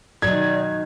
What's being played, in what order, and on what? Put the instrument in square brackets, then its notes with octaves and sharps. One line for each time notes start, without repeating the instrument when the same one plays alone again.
[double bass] B2 D#3 [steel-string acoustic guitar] F#3 D#4 [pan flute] D5 [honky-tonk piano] G#6